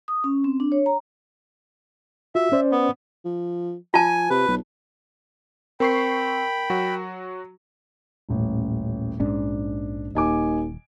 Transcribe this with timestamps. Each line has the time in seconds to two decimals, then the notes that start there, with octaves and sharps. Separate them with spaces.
0.08 D#6
0.24 C#4
0.44 C4
0.60 D4
0.72 C#5
0.86 A#5
2.35 F4 F#4 E5
2.52 C#4 C5 D5
2.72 B3
3.25 F3
3.94 F3 F4 G#5 A5
4.30 C3 B4
4.48 B1
5.80 C4 A#4 G5 B5 C#6 C7
6.70 F#3 F#4
8.29 D#1 A1
9.20 A#1 G#2 C#4 D4
10.15 D#1 D#2 D#5 G#5 D6